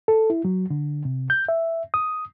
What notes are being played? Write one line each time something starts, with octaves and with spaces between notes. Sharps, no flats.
A4
E4
F#3
D3
C3
G6
E5
D#6